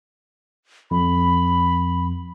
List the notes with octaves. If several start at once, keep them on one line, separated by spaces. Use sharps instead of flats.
F2 B5